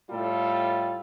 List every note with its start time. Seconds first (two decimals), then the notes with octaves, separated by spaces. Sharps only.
0.10 A2 G3 F4 A4